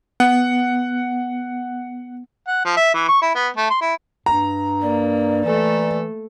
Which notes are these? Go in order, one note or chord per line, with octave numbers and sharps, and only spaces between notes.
B3 F#5
F#5
F3
E5
E3
C#6
E4
B3
A3
C6
E4
G2 A#5
A#3 D5
E3 A3 A4